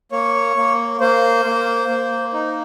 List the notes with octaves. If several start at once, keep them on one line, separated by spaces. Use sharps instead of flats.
A#3 C#5
A#3
A#3 C5
A#3
A#3
D#4